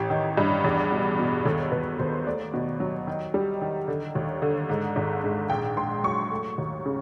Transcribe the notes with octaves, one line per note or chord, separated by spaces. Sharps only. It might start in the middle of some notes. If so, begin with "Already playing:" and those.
Already playing: A1 G4
D#3
G2
E2
B2
B2
D#2 A4
D#2 B4
D#2 C5
A3 D5
B2
F#3
D#3
G3
D#3
D3
D#2
D3
G#2
G#1
G#2
A#1 G5
A#1 C6
F#3 C#6
A3
D#2
C#3